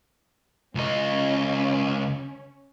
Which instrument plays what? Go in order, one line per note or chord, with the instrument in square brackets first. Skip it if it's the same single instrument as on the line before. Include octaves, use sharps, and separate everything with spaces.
[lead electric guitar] C#2 D#5 [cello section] C#4